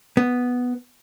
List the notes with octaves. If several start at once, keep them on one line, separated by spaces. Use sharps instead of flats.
B3